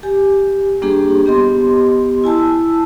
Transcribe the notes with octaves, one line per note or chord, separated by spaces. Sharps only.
G4 G#5
G3 A#3 D4 G4 G#4
B3 G4 D#5 C6
E4 G#5 A5 E6